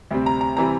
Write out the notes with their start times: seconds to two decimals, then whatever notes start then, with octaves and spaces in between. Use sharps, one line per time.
0.11 D2 C3 G3 C4
0.26 A#5
0.41 A#5
0.56 C3 E3 G3 C4 A#5